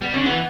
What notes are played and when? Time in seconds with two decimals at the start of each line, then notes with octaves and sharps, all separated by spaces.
0.01 G3 B3
0.14 D3 C#4
0.26 E3 B3